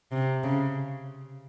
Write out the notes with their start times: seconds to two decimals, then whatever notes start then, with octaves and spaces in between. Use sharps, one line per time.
0.12 C3
0.44 C#3